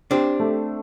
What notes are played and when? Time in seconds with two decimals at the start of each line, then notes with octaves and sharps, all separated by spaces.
0.11 C4 D4 G4
0.40 A3